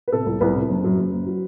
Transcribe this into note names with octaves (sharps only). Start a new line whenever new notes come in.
B4
C3 A4
C2
C2 B4
C3
F#1
F#2
F#1
F#1
F#3